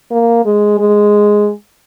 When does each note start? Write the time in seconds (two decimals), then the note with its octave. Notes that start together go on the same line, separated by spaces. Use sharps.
0.11 A#3
0.45 G#3
0.79 G#3